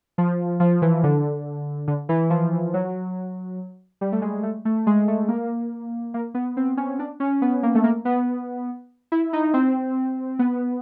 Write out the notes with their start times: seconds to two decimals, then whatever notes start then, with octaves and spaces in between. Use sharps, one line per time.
0.18 F3
0.60 F3
0.82 E3
1.04 D3
1.88 D3
2.09 E3
2.30 F3
2.74 F#3
4.01 G3
4.12 A3
4.22 G#3
4.43 A3
4.65 A3
4.87 G#3
5.08 A3
5.28 A#3
6.14 A#3
6.34 B3
6.57 C4
6.77 C#4
6.99 D4
7.20 C#4
7.42 B3
7.63 A#3
7.75 A3
7.84 A#3
8.05 B3
9.12 E4
9.33 D#4
9.54 C4
10.39 B3